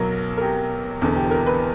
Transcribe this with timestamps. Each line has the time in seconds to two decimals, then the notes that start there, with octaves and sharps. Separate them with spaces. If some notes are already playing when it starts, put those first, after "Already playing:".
Already playing: B1 B2 F#3 A#4
0.37 A#4
0.41 G4
1.02 E1 E2 D3
1.16 G4
1.31 A#4
1.46 B4